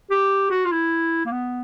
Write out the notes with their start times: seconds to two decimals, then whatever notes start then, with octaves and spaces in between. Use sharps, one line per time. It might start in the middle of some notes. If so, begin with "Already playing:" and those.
0.11 G4
0.51 F#4
0.65 F4
0.71 E4
1.26 A#3
1.32 B3